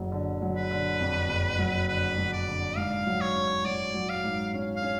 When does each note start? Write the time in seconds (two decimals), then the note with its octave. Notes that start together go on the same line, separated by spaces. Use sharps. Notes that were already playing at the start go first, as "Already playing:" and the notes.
Already playing: F#1 D3 F#3
0.12 D3
0.42 F#3
0.56 B4
0.71 D3
1.00 F2
1.29 F#1
1.59 F#3
1.88 D3 B4
2.18 F#3
2.33 D5
2.47 D3
2.76 G#2 F5
3.06 F#3
3.21 C#5
3.35 C#4
3.65 F#3 D5
3.94 F#3
4.09 F5
4.24 G#2
4.54 C#4
4.76 F5
4.82 C#4